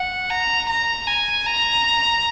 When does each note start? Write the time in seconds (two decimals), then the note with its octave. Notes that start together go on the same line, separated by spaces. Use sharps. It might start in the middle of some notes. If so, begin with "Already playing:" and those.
Already playing: F#5
0.30 A#5
0.68 A#5
1.07 G#5
1.46 A#5